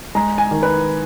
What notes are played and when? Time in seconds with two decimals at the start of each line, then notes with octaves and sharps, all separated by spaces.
0.15 G#3 A#5
0.38 G#5
0.51 D#3
0.63 B4